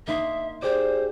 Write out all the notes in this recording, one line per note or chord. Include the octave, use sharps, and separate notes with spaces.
A#3 D#4 E5 C6
G4 G#4 C5 D5